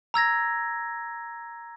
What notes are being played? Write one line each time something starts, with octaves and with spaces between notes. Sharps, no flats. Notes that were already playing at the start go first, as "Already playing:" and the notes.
A#5 E6 G#6 A#6